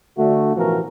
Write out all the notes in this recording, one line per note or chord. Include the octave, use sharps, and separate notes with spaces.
D3 A3 F#4
A1 B2 E3 F3 F#4 A#4